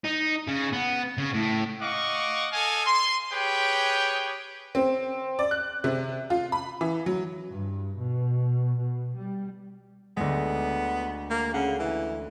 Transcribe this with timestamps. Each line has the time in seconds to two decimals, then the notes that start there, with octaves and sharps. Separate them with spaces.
0.04 D#4
0.48 C#3
0.73 B3
1.18 C#3
1.34 A2
1.81 D#5 F5 F#5 C#6 D6
2.52 A4 D#5 F5 G#5
2.86 C6
3.32 G4 G#4 B4 C#5 G5
4.75 C4
5.39 D5
5.51 F#6
5.84 C3
6.30 F4
6.52 B5
6.81 E3
7.06 F#3
7.48 G2
7.96 B2
8.77 B2
9.19 G3
10.17 D2 G#3 B3
11.30 A#3
11.54 C#3 F#5
11.79 E3